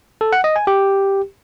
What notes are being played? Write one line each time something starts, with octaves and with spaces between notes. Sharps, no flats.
A4
F#5
D#5
G#5
G4